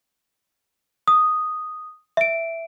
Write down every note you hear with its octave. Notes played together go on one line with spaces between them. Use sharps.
D#6
E5 D7